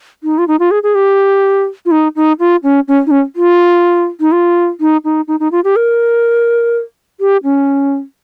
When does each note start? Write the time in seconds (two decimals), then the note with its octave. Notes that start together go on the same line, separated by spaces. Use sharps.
0.24 D#4
0.38 F4
0.48 D#4
0.60 F4
0.71 G#4
0.83 G#4
0.95 G4
1.86 F4
1.91 D#4
2.16 D#4
2.39 F4
2.63 C#4
2.88 C#4
3.07 D#4
3.11 C#4
3.36 F4
4.20 D#4
4.32 F4
4.80 D#4
5.04 D#4
5.28 D#4
5.40 D#4
5.52 F4
5.64 G4
5.76 A#4
7.20 G4
7.44 C#4